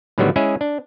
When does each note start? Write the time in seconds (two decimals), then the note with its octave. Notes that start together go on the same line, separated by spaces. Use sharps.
0.18 A2 D3 D#3 F#3 G3 B3
0.36 G#3 C#4 E4 G#4 E5
0.61 D4